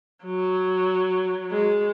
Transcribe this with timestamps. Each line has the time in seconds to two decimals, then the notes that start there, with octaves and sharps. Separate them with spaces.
0.25 F#3
1.51 G#3